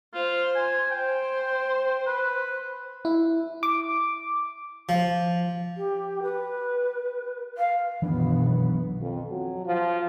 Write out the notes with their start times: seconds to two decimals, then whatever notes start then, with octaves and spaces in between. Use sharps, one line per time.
0.14 F4 C5
0.56 G#5
0.91 C5 G5
2.07 B4
3.05 E4
3.63 D6
4.89 F3
5.77 G4
6.23 B4
7.58 F5
8.02 B1 F#2 D#3 E3 B3 D4
9.01 F2
9.31 F#3
9.66 F3